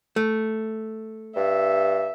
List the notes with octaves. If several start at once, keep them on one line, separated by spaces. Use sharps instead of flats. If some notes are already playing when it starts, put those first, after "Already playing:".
A3
G2 E5